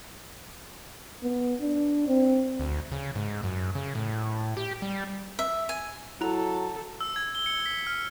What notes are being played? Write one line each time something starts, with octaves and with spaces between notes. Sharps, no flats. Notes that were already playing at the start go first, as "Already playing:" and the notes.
B3
D4
C4
D2
C#3
G#2
F#2
C#3
A2
G4
G3
E5
G#5
F#3 E4 A4 A#5
E6
G#6
G7
C#7
B6
F6